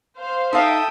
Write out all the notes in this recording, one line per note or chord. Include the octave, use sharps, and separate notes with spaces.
C5 F5
D#4 A4 E5 F5 G5 D#6